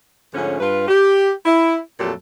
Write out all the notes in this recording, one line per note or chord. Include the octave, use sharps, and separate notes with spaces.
G#2 D3 F3 A3 C#4
G2 F4 B4
G4
E4
F2 A#2 F#3 A3 G4 A4